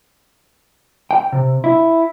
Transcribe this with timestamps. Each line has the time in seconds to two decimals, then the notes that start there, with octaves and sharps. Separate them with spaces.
1.11 G5
1.32 C3
1.64 E4